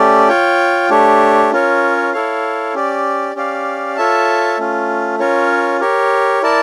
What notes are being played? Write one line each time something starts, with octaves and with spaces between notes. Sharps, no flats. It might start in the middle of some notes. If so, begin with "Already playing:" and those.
Already playing: A3 C#4 G4 D5
F4 C#5 G5
A3 D4 G4 C#5
C#4 F4 A#4 C#5
E4 A4 C#5 F5
C#4 G4 D5
C#4 G4 D5 F5
F4 A4 C#5 E5 A5
A3 C#4 F4
C#4 F4 A#4 C#5
G4 A#4 C#5
E4 A#4 D5 A5